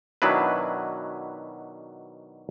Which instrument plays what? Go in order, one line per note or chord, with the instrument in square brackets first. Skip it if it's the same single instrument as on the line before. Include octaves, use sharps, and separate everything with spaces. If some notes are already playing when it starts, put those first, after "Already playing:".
[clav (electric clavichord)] B2 D#3 F#3 D4 E4 B4